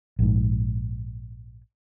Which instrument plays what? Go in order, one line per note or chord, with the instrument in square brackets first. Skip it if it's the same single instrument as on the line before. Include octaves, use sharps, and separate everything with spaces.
[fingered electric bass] A#1 G#2